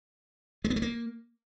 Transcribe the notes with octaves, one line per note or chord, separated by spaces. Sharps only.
G#3
B3
A3
A#3